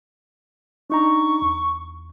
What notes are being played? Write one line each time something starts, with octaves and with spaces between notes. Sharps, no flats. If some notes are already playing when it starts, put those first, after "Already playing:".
D4 D#4 A#5 C#6
E2